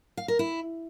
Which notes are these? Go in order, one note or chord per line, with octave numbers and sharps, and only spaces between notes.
F5
A#4
E4